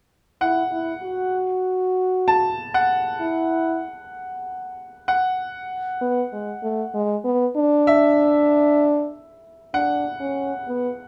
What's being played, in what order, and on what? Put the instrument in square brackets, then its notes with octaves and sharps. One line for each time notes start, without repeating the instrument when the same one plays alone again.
[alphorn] E4 [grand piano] F#5
[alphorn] E4
F#4
[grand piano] A5
F#5
[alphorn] E4
[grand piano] F#5
[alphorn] B3
G#3
A3
G#3
B3
D4
[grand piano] E5
[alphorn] D4 [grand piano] F#5
[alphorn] C#4
B3